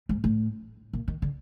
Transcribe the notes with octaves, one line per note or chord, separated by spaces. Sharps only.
G#2
A2
A#2
D#3
D3